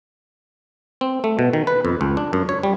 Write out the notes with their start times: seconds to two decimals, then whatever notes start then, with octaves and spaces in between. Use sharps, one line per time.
1.01 C4
1.24 A3
1.39 B2
1.53 D#3
1.67 B4
1.85 F2
2.01 C#2
2.17 D4
2.33 F#2
2.49 C#5
2.63 G3